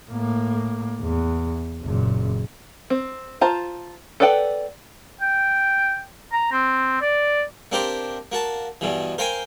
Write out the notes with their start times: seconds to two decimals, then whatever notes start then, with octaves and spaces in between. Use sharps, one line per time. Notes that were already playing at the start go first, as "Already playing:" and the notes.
0.10 A2 A#3
1.01 E2
1.83 F#1 A#2
2.90 C4
3.41 F4 C5 A5 A#5
4.20 A4 B4 D5 F#5 G5
5.21 G5
6.32 A#5
6.52 C4
7.02 D5
7.72 A#3 C4 D4 G4 A#4 C5
8.32 A#3 F#4 A5
8.81 G2 B2 E3
9.18 A#4 C5 F5 G5 G#5 C6